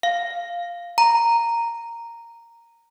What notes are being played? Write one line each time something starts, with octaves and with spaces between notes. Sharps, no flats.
F5
A#5